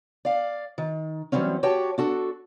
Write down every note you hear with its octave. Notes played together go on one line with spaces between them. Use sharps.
D5 F5
D#3
E3 F#3 G3 C4 C#4
F#4 G4 C#5 G5 A5
D4 F#4 A4